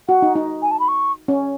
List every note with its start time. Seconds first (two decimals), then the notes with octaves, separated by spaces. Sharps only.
0.08 F#4 F#5
0.22 D#4
0.36 D#4
0.62 G#5
0.71 A5
0.80 B5
0.88 C#6
1.28 C#4